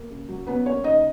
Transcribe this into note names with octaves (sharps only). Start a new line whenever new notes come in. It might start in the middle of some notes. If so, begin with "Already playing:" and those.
Already playing: A#3
C#3
F#3
B3 C#4 B4
A#3 C#4 C#5
C#3 D#4 D#5